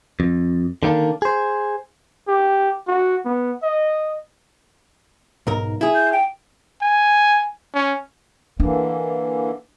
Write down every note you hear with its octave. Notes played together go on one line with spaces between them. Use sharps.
F2
D3 D#3 A#3 D4
G#4 C5
G4
F#4
B3
D#5
B1 G#2 A#4
E4 G#4
G6
G5
G#5
C#4
D3 E3 A#3 D4